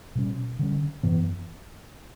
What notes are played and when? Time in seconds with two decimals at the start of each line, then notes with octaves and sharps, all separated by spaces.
0.15 B2 G3 C#4
0.59 D3 G3 C#4
1.03 F#2 E3 B3